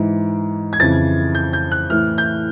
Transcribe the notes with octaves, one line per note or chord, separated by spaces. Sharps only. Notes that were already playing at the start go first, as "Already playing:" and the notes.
Already playing: G#2 E3
G#6
F2 C#3 E3 A6
G6
G6
F#6
A2 E3 F6
G6